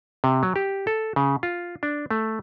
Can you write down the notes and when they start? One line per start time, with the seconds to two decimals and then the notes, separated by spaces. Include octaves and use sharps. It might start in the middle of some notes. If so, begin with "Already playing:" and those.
0.24 C3
0.43 F#3
0.56 G4
0.87 A4
1.16 C#3
1.43 F4
1.83 D4
2.11 A3